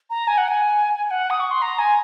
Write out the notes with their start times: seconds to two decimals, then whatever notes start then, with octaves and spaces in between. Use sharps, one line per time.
0.10 A#5
0.28 G#5
0.38 F#5
0.48 G#5
0.95 G#5
1.07 G#5
1.11 F#5
1.30 D#6
1.40 C#6
1.51 C6
1.62 A#5
1.79 G#5